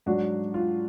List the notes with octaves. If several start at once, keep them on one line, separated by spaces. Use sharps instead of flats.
G#2 F#3 D4 F#4
F4